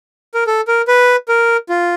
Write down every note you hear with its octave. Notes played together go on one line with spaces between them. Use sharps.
A#4
A4
A#4
B4
A#4
F4